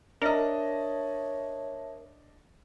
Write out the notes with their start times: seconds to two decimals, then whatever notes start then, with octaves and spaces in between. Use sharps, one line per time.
0.22 D4 A#4 C#5 D#5 E5 A5